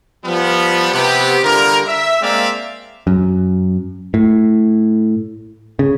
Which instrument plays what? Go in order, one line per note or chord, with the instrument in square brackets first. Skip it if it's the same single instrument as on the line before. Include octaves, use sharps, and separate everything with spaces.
[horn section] F3 G3 B3
C3 B3 G4
D3 G3 F4 A#4
E5
G#3 A#3 C4 D5 E5 F5
[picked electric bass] F#2
A2
C#3